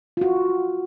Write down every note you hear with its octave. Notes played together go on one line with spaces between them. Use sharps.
F4 F#4